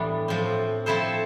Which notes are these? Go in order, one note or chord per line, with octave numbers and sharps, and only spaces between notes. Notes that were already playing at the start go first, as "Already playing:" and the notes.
Already playing: A2 E3 G3 B3 D4
A2 F3 C4
F3 C4 E4 A4 C5